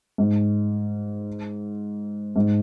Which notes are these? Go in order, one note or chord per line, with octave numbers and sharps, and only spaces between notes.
G#2
G#2